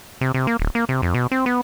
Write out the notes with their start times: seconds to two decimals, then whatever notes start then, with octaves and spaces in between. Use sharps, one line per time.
0.21 C3
0.34 C3
0.47 A#3
0.60 D1
0.75 A#3
0.89 C3
1.02 F2
1.14 B2
1.31 C4
1.46 B3